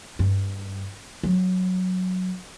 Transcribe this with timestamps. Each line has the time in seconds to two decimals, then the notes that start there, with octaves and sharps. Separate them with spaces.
0.19 G2
1.23 F#3